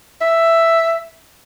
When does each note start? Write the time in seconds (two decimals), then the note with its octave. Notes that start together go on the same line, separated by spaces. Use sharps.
0.21 E5